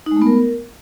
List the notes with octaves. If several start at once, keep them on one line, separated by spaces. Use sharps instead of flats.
D#4
G#3
A3
B3
A#4